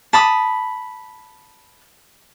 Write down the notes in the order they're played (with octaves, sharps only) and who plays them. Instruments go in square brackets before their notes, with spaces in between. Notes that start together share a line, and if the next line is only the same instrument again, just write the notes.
[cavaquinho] A5 B5 D#6